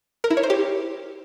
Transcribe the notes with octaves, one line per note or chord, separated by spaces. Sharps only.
A#4
E4
C#5
C5
G4